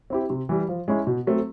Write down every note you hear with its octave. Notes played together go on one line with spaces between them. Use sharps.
C4 E4 G4
C3
E3 G3
F3
G#3 C#4 E4
B2
F#3 A3 C4